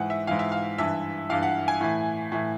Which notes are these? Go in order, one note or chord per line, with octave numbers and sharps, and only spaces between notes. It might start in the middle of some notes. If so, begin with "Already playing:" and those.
Already playing: G#2 E3 F#5
E5
G#2 E3 F5
E5
F5
G2 E3 E5
G2 E3 F5
F#5
G#5
A2 E3
A2 E3